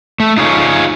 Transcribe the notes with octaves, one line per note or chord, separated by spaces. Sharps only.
A3
D#4 F4 G#4 C#5